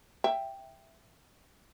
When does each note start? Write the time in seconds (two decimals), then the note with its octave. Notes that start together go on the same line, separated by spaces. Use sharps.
0.24 E5 G5